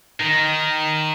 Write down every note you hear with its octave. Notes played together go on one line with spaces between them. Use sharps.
D#3